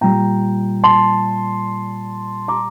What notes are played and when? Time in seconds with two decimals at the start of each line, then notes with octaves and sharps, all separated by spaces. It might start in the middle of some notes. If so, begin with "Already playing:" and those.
0.01 A#2 G3 G5 A#5
0.84 A5 C6
2.48 A#5 D6